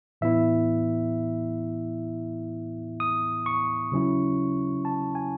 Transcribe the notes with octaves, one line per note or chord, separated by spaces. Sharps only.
A2 E3 B3 E4 E5
D#6
C#6
C#3 F#3 C#4 E4
A5
G#5